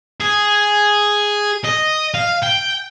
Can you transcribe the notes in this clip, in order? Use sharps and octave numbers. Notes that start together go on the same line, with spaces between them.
G#4
D#5
F5
G5